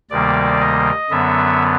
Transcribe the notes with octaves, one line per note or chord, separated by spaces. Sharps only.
D2 C3 D#3 G3 A#3 D5
D#5
F#2 D3 F#3 B3 E5